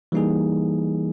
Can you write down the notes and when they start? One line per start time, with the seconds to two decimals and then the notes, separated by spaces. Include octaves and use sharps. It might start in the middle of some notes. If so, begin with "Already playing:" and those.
0.12 E3 G3 A#3 D#4 G#4